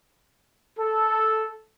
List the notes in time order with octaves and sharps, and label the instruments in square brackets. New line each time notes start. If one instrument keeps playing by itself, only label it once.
[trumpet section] A4